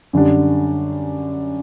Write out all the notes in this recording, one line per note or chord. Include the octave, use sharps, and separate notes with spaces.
F#2 D3 G3 D4